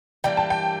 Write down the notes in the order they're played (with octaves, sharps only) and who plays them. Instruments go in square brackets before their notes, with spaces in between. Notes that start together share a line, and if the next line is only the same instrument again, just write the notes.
[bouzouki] E3 G3 A#3 D4 [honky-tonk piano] G5
[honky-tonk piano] A5
G5